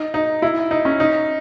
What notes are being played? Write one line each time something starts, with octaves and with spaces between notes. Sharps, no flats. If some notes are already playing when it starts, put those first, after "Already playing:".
Already playing: D#4
D#4
E4
D#4
C#4
D#4